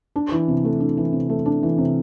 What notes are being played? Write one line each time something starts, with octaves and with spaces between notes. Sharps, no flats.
D4
E3
C3
A3
D4
E3
C3
A3
D4
E3
C3